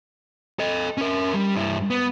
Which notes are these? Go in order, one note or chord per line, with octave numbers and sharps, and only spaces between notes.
A4 D#5
C#4 A#4
G3
G2 E4
B3